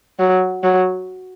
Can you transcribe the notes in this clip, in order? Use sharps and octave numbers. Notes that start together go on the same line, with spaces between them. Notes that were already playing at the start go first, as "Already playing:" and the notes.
F#3
F#3